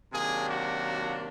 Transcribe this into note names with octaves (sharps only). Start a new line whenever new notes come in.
C3 D#3 F#3 A#3 D4 G#4
F#4